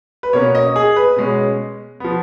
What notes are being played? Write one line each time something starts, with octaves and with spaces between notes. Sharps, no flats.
B4
B2 A#3 C#4 C#5
D#5
G#4
B4
B2 G#3 C#4
F3 B3